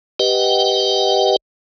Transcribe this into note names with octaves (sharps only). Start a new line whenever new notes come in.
G4 B4 D#5 F#5 G5